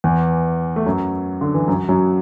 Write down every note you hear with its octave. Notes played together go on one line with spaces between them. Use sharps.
E2 E3
A3
F#2 F#3
D3
E3
F#2 F#3
F#2 F#3